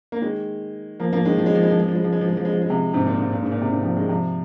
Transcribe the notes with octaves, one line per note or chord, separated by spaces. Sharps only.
A#3
D#3 G#3
F3 A#3
F3 A#3
D#3 G#3
F3
G#3
F3
G#3
F3
G#3
F3
G#3
F3
G#3
F3
G#3
F3
G#3
F3
G#3
C3 F3
G#2 C3
A#2
G#2
A#2
G#2
A#2
C3
A#2 D#3
C3 F3
D#3 G#3
C3 F3